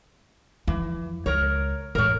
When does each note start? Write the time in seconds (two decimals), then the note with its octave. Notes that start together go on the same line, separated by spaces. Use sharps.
0.67 F2 E3
1.26 C#2 A#4 C#5
1.95 A1 F2 A#4 C#5